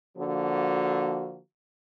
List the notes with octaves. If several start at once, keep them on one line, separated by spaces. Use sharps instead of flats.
D3 F3 A#3 F#4